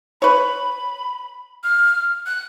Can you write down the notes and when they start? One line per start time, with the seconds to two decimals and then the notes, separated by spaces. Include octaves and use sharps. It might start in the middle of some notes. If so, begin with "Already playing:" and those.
0.22 B4 C#5 B5
1.64 F6
2.26 F#6